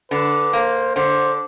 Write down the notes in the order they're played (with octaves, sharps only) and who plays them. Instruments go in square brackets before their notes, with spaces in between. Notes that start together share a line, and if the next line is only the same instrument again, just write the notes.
[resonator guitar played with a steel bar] D3 [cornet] B4
[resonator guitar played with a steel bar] A#3 [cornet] C5
[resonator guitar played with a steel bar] D3 [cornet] C5